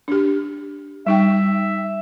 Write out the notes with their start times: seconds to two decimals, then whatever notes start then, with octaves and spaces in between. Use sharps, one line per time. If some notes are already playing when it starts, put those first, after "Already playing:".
0.08 D4 G4
1.06 G3 D#4 E5 G5